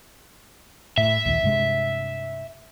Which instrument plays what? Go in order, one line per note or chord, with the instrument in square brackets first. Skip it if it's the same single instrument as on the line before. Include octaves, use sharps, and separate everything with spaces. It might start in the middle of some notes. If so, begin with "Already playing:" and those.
[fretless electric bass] A2 [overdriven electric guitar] E5
[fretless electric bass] A#1 D#2
G2 C3 G#3